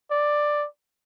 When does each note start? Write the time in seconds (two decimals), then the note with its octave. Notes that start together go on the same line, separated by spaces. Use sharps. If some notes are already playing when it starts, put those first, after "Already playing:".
0.11 D5